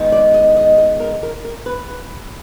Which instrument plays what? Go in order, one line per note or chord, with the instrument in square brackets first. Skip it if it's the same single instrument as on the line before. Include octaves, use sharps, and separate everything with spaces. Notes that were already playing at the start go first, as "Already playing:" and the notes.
Already playing: [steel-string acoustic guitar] D#3 G#3 B3 D#4
D5
D#5
D#5
D#5
A#4
A#4
A#4
B4
B4